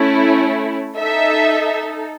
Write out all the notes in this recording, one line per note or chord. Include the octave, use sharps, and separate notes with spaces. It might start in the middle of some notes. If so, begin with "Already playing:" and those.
Already playing: A3 C#4 E4
D#4 A4 E5